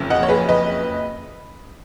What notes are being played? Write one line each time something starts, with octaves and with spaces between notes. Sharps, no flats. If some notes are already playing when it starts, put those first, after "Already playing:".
Already playing: F#1 F2 C#3
D#5 F#5
C#5
G#4 B4
B4 D#5